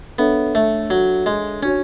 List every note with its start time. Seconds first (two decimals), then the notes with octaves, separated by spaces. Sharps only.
0.19 B3 D4 A4 C#5 E5
0.55 A3
0.90 F#3
1.26 G#3
1.63 C#4 D4 F#4 C#5